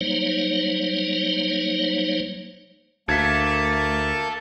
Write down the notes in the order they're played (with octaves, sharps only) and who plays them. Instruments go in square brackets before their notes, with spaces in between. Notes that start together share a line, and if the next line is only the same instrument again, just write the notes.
[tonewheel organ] F#3 G3 A#3 D#4 C5 C#5
[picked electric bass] D2 [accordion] A#3 A5 [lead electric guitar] A4 E5 [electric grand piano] G#6 B6